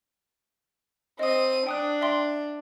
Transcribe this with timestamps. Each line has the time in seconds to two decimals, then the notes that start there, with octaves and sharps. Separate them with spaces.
1.19 C4 D#5 D#6 D#7
1.67 D4 G5 D#6 F#6
2.01 E5 G5 C6